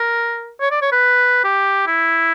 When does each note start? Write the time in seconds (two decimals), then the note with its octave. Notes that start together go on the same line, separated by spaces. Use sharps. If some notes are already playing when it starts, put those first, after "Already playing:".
Already playing: A#4
0.61 C#5
0.71 D5
0.82 C#5
0.92 B4
1.44 G4
1.87 E4